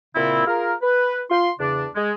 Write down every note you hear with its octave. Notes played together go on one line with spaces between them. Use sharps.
A#2 C#3 C4 E4
F4 G#4 A#4
B4
F4 C6
E2 C#3 D4
G#3